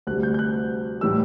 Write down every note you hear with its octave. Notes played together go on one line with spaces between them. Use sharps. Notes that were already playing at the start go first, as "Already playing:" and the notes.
D2 C3 G3 F#6
G6
G6
F#6
A2 E3 G3 E6